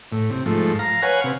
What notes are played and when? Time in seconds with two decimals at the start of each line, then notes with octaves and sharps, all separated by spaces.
0.12 A2
0.30 C3
0.46 G#2 F3 A3
0.79 F5 A#5
1.03 B4 C#5 F5 F#5 G#5
1.24 C3